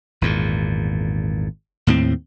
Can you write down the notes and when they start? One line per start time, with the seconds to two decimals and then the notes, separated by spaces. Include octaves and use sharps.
0.21 G#1 E2 A#2
1.87 D#2 A2 A3 C4